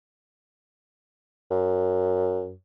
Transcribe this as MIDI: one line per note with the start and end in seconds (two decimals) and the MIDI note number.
1.51 2.53 42